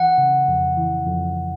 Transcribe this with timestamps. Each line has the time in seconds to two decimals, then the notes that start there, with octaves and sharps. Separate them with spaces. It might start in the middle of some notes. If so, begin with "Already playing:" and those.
Already playing: E3 F#5
0.18 C#3
0.48 F2
0.77 E3
1.07 F2